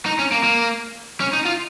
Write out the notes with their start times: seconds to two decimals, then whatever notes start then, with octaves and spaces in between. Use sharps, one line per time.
0.06 D#4
0.19 C#4
0.32 A#3
0.43 A#3
1.20 C#4
1.33 D#4
1.45 F4